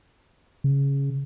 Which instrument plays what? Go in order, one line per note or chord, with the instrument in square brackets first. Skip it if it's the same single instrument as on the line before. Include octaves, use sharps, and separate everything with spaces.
[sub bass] C#3